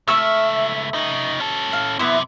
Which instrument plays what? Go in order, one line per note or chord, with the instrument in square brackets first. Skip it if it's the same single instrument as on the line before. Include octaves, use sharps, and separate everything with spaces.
[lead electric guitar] C#2 E5 [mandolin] A3 E6 F6
[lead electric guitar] C#3 D#4
C#4 A4
[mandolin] F5
[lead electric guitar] F#2 C3 [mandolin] B3 E4